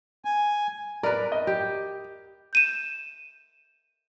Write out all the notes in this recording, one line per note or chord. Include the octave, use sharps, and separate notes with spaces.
G#5
A#4 B4 D5
D#5
G4
G6 D#7 E7